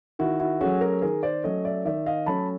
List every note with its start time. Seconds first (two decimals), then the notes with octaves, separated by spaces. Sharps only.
0.19 D#3 E4 F#4
0.40 E4 F#4
0.61 F#3 A3 C#4 F#4 G#4
0.81 G#4 A#4
1.02 D#3 G#4 A#4
1.23 C5 D5
1.44 F#3 A3 C#4 C#5 D#5
1.65 D5 E5
1.85 D#3 D5 E5
2.06 D#5 F5
2.26 F#3 A3 C#4 A5 B5